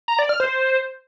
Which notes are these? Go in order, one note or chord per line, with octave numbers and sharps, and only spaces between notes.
A#5
D5
F6
C5